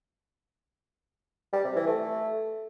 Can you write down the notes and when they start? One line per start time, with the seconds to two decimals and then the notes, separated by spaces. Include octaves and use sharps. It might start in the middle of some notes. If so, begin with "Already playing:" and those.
1.53 G3
1.64 C3
1.76 E3
1.87 A3